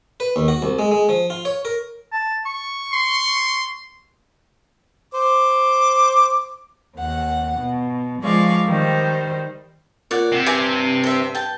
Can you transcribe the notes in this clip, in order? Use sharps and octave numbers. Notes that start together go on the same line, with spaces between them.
B4
D#2
F#4
C2
G#3
G#3
F3
F4
C#5
A#4
A5
C#6
C6
C5 D6
D#2 F#5
B2
F3 G#3 D5 F5 C#6
D#3 G3 C5
A#2 C#5 D5 F#5
C3
G2 E4 G#5 D6
C5 E5
G5 A5